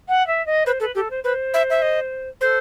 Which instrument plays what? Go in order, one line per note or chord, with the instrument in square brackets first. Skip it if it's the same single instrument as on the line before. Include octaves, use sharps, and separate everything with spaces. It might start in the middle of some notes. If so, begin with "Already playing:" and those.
[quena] F#5
E5
D#5
[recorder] B4 [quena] C5
[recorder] A4 [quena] B4
[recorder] G4 [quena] A4
[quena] C5
[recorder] B4 [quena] C5
[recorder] E5
E5
D#5
[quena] A4 [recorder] C5